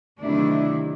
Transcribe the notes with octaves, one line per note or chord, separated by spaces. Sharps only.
D2 C3 D#3 F#3 D4 E4